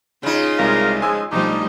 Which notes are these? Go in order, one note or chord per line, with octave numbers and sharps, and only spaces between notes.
C#3 D#4 F4
C2 C3 G#3 A#4 F5
F3 G#3 G#5 E6
B1 F3 G3 A3 D4 D#4